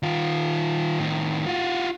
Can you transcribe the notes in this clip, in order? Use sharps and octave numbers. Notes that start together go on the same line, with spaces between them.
D#3 F4
A2 D#3
F4 F#4